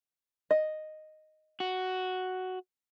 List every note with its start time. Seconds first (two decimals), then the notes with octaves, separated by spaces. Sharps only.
0.51 D#5
1.60 F#4